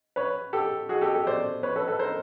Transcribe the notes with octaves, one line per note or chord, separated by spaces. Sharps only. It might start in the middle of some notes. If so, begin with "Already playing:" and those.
B4 C#5
G4 A4
F#4 G#4
G4 A4
G4 A4
C5 D5
B4 C#5
A4 B4
A4 B4
A#4 C5